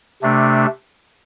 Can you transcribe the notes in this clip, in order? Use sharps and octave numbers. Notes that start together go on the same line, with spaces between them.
C3 A3 D4